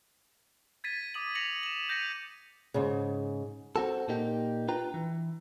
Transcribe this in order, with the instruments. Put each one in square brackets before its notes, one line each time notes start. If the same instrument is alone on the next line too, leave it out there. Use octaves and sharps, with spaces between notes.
[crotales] G#6 A6 B6 D#7
D6 D#6 D#7 F#7
A#6 C#7 F7 F#7
E7 F#7
G6 A#6 B6 C#7 D#7 F7
[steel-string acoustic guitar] G#2 C#3
[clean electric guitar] C4 F#4 A4
A#2 A#3 D#4 G4
D4 F4 B4 G5 A#5
E3